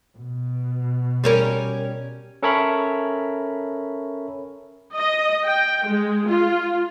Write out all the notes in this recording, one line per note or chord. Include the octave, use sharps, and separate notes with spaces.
B2
G3 C#4 A#4
C#4 A4 A#4 C#5 E5 B5
D#5
G5
G#3
F4